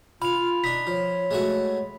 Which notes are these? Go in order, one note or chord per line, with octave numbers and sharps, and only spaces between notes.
F4 F5 B5 F7
D4 D#4 B6
F3 C#5
G#3 A3 F#4